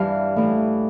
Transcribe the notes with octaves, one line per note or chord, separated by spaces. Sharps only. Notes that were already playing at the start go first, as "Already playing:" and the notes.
Already playing: G2 E3 F5
A2 E3